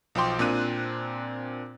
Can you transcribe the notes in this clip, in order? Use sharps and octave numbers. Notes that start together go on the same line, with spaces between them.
B1 F3 C5 G5 C6 D6
A#2 C4 D4 F#6 D#7